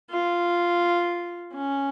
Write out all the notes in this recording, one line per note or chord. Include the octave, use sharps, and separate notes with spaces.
F4
C#4